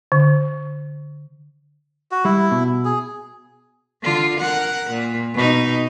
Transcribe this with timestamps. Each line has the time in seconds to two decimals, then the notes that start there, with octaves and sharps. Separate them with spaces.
0.12 D3
2.11 F#4
2.25 G3 E4
2.51 B2
2.85 G#4
4.02 D3 F4
4.40 A#4 F#5
4.90 A#2
5.34 B2 D#4